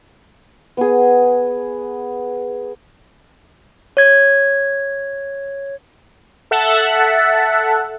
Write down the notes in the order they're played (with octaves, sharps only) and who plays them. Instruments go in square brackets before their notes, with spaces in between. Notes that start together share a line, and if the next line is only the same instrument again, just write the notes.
[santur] B3 G#4
[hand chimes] C#5 G#6
[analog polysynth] A4 E5 F#5 A5